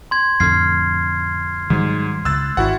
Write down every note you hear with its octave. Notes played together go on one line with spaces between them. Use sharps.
C6 G#6
F2 A2 D3 F6 G#6 C7
G#2 D#3 F#3 G3
C#2 E6 F#6 A6
G#1 E4 F#4 F#5